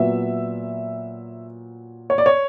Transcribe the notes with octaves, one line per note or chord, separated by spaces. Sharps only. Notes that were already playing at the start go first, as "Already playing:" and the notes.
Already playing: A#2 F#3 B3 E5
C#5
D5
C#5